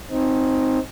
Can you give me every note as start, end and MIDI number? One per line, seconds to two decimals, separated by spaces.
0.10 0.79 60
0.10 0.79 63